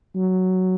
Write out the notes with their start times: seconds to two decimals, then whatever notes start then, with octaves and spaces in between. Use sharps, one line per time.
0.15 F#3